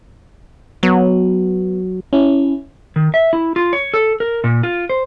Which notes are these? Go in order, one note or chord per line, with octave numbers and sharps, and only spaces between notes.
F#3 B3
C#4 E4
D#3
E5
E4
F4
C#5
A4
A#4
A#2
F4
C5